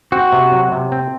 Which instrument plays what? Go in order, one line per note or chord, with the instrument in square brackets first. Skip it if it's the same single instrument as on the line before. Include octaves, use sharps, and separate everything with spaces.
[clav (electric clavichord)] C4 [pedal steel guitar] F#4
[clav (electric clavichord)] C3
F#3
C3
C4